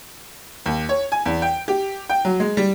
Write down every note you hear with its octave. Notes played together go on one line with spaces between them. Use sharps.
D#2
C#5
G#5
E2
G5
G4
G5
F#3
G#3
G3